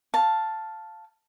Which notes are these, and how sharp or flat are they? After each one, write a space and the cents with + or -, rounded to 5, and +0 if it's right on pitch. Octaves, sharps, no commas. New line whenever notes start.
F5 +0 A5 +0